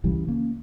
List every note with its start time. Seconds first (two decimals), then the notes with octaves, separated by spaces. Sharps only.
0.04 C#2 C#3 E3 G3
0.28 A#3 C#4